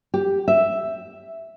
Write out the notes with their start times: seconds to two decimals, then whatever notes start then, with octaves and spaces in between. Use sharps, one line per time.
0.14 G4
0.48 E5